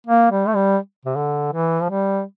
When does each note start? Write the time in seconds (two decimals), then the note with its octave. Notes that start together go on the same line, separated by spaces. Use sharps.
0.07 A#3
0.31 G3
0.47 A3
0.55 G3
1.05 C3
1.16 D3
1.53 E3
1.82 F3
1.89 G3